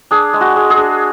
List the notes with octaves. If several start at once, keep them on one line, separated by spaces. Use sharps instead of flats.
D4 G#4
G#3
F#4
G#3
G#4
D4